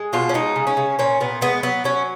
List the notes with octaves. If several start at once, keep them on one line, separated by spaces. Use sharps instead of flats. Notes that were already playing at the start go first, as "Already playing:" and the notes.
Already playing: G#3
B2 F4
C#4
G#3 D#4
C#3
C#4
C#3
A#2 C#4
A#2 B3
G#3 B3
F#3 B3
F#3 C#4